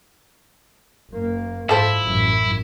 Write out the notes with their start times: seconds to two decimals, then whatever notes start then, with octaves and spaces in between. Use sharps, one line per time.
1.11 F#1 A#3
1.69 G#2 F3 E4 A4 C5
2.02 A1 F#2